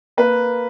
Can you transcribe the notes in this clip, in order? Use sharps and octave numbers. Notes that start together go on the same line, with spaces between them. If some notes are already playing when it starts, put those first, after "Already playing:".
A#3 B4